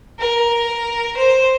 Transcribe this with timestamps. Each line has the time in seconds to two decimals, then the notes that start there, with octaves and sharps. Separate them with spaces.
0.19 A#4
1.17 C5